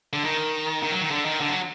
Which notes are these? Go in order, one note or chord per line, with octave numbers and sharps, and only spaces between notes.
D3
D#3
D#3
F#3
D#3
D3
D#3
D3
F#3